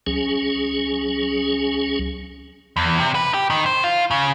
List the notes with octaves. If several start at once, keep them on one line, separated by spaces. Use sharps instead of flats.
C#2 F#3 C#4 G#4
E2
C3
B4
G4
D#3
C5
F4
C#3